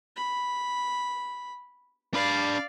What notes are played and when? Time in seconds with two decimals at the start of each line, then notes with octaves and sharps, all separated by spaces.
0.16 B5
2.14 D4 D5 F5 B5